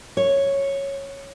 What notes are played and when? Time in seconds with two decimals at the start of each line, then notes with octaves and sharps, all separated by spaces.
0.17 C#5